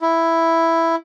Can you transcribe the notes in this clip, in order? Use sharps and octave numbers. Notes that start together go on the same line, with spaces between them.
E4